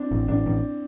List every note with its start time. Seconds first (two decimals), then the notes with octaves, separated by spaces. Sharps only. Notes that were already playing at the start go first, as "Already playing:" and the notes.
Already playing: C4 D4
0.11 A1
0.28 A1 D4
0.46 A1